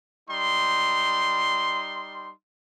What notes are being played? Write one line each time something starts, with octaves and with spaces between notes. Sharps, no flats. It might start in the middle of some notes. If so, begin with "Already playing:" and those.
G3 D#4 C6